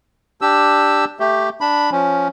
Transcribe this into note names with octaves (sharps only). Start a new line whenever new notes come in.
D4 G4 E6
A3 G4
D4 B5
F3 C#4